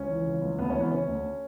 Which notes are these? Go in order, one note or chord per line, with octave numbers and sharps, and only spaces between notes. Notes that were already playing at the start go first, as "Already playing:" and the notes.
Already playing: C#2 C#4
E3
C#3
C#2
D2 B3
C#4
E3
B3
C#3 C#4
D2